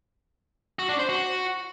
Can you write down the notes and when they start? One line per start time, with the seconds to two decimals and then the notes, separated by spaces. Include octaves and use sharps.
0.79 F#4
0.89 D4
0.99 C5
1.09 F#4